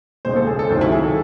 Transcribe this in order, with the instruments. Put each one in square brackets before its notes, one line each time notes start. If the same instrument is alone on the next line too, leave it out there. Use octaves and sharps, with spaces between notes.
[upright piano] E1 D#2 C#3 G#3 C5
A4
G#4
A4
C#2 C3 D#3 F#3 C5
E4
G#4
A4